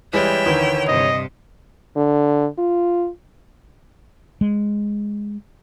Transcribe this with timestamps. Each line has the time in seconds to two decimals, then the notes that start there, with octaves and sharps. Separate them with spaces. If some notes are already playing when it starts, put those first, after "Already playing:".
0.13 E3 G3 G#3 C#5 E5 G5
0.46 D2 D#3 E3
0.88 G2 C3 D#5
1.96 D3
2.58 F4
4.41 G#3